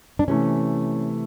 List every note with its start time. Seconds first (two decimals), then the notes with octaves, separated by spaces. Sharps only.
0.19 D4
0.28 C3 E3 A3 C#4